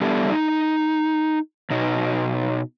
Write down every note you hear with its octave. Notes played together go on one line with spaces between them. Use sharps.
G3 B3 D4 E4 G4 A4
D#4
B2 D#4 F#4